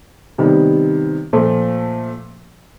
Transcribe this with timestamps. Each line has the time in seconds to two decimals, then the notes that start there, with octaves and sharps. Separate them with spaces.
0.38 C3 D#3 G3 B3
1.33 A#2 F3 A3